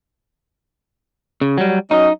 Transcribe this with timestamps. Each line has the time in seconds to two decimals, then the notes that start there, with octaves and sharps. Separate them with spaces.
1.41 C#3
1.58 F#3 G3
1.91 F#3 C#4 D#4 D#5